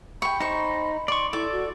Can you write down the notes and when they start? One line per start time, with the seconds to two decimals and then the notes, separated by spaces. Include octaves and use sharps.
0.22 G5 B5 C#6
0.40 D#4 C5 C#6
1.08 D5 C6 C#6
1.33 E4 A4 D5 D6
1.52 F#4